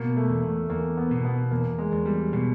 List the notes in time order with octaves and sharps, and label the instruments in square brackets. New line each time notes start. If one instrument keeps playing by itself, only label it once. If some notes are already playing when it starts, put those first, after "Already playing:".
Already playing: [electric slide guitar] B2 [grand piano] A#3
[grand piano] A3
[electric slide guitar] E2
[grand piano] A3
[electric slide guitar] E2 [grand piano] A#3
[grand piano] B3
[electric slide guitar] B2
[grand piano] B3
[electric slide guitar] E2 [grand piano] A#3
[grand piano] G#3
[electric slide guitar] E2
[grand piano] G3
[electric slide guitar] B2